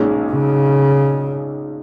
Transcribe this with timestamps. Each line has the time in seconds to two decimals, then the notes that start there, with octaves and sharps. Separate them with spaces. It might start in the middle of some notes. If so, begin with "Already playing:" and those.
Already playing: B1 A#2 G#3 C#4
0.32 C#3